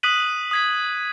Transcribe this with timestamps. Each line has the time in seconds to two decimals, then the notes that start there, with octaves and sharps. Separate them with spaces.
0.03 D#6 F#6 B6 D#7 F#7
0.51 D#6 G#6 B6